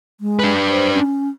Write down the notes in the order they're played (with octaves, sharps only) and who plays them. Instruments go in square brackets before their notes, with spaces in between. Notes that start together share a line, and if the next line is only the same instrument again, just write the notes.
[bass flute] G#3
[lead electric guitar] D4 B4
[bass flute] C5
C#4